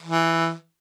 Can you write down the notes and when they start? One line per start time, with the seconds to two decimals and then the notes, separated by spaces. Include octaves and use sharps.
0.03 E3